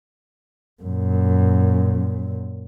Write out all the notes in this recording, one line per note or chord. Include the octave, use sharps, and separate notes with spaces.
F#2 A#2